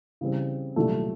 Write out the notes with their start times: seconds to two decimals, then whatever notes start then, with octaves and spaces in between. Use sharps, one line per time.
0.21 C#3 E3 G3 C4
0.76 C2 A#2 F#3 A3